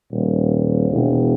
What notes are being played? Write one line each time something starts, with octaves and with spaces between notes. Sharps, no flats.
D#1
E1